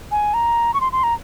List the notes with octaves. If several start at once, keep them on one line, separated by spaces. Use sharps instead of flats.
G#5
A#5
C#6
C6
C6
A#5